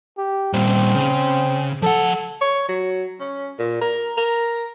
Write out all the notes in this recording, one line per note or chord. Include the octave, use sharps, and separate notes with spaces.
G4
A#2 G3 C4
C#3
F3 A4 F#5
C#5
F#3
C#4
A#2
A#4
A#4